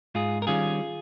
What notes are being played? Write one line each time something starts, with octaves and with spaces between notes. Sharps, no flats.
G#2 F4 G#4
A#4
D#3 G3 C#4 F4 G#4